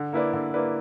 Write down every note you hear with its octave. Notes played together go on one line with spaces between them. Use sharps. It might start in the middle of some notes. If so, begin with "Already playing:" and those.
Already playing: D3
A#3 E4 B4 D5
D3
A#3 E4 B4 D5